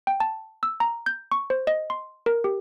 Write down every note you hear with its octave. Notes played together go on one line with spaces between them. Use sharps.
G5
A5
E6
A#5
G6
C#6
C5
D#5
C6
A#4
G4